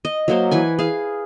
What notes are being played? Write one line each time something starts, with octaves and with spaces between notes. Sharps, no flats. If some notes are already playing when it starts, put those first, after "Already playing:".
D#5
F#3 A#3 C5
E3 B4 G#5
G#4 F5